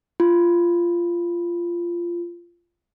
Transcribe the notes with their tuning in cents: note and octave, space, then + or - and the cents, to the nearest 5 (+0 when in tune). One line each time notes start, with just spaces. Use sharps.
F4 -15